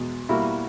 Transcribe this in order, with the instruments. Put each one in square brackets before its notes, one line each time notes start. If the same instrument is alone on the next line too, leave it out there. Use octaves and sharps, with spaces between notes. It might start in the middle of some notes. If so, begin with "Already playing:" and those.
Already playing: [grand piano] E2 B2 G#3
B2 G3 A#3 E4 F#4